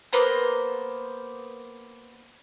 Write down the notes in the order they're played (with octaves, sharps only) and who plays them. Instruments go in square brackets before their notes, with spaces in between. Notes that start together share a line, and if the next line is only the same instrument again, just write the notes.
[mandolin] A#3 B3 C5 A#5